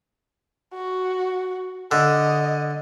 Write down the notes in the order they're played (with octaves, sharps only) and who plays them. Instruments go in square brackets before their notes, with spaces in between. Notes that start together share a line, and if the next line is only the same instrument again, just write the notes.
[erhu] F#4
[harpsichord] D3 [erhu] D#5